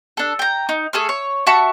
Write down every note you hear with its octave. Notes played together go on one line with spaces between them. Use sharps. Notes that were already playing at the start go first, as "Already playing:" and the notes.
D4 A4
G5 A#5
D#4
A3 G#4 A4 F6
C#5
F#4 E5 A5 C#6